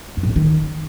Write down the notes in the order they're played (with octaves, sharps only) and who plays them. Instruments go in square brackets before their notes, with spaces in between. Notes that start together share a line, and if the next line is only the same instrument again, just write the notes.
[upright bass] F#2
A2
F3
D#3